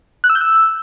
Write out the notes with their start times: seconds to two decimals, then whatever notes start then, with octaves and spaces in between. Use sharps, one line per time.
0.24 F#6
0.30 E6
0.35 G6
0.41 E6